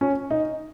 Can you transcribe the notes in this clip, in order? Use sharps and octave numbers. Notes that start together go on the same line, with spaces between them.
C#4
D#4